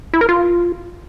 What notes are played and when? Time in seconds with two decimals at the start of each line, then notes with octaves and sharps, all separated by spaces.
0.14 E4
0.21 A#4
0.29 F4